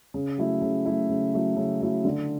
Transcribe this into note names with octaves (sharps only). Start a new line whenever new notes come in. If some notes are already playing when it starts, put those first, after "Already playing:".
C#3
F#3 A3 E4
C#3
F#3 A3 E4
C#3
F#3 A3 E4
C#3
F#3 A3 E4
D3